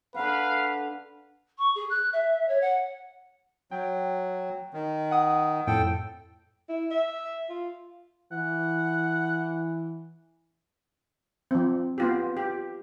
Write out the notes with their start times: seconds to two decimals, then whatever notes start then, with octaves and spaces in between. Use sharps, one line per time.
0.14 D3 B4 F5 F#5
1.58 C#6
1.75 G#4
1.90 F#6
2.13 E5
2.48 C#5
2.61 F#5
3.71 F#3 G5
4.74 D#3
5.11 F#5 D#6
5.67 F2 A2 A4 G5
6.69 E4
6.91 E5
7.50 F4
8.32 E3 F#5
11.51 F3 C4
11.98 B3 F4 G4
12.37 G4